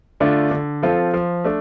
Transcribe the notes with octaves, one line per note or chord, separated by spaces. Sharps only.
D3 A3 D4 F4
D3
F3 C4 F4 A4
F3
A3 D4